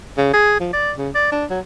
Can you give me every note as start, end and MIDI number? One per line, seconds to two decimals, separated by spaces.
0.18 0.31 49
0.33 0.57 68
0.60 0.68 53
0.73 0.92 74
0.98 1.10 49
1.15 1.28 74
1.32 1.45 62
1.50 1.59 54